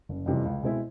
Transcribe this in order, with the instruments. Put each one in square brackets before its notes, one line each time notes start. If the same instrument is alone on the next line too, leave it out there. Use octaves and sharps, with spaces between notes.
[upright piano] F#1
F2 C3 E3 G3
C#2
B2 G#3 C4 E4